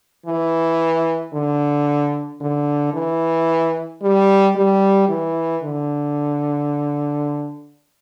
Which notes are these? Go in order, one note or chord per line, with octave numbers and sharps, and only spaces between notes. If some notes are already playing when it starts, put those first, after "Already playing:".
E3
D3
D3
E3
G3
G3
E3
D3